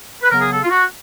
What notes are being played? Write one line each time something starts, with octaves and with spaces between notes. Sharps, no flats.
B4
C#3 F#3 B3 A#4
G#4
A4
F4
F#4